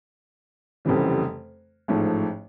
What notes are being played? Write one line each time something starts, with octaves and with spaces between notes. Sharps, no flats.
F1 F2 C#3 E3 G3
A1 G#2 F3 A3